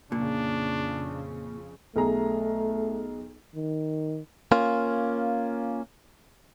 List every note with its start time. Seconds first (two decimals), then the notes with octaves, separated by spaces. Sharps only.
0.12 F2 A#2 C#3 D4
1.96 B1 A3 G#4 A#5
3.55 D#3
4.52 A#3 C#4 F4